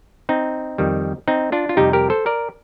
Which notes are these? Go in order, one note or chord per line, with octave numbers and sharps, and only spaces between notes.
C4 D#4
F2 D#3 G3
C4 D#4
D4 F4
F4
F2 C3 G3 D#4 G4
G4 A#4
A4 C5
A#4 D5